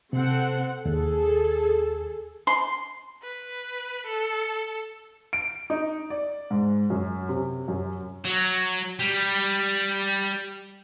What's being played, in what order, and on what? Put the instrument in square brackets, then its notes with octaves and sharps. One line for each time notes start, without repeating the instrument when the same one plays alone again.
[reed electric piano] C3 [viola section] C4 A4 F#5
[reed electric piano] D#2 [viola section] G#4 A4
[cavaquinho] C6
[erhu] B4
A4
[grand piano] D7
D#4
D5
G#2
F#2
C3
F#2
[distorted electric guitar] F#3
G3